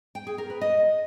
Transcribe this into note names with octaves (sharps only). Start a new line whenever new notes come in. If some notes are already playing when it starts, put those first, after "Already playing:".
G5
G#4
A#4
B4
D#5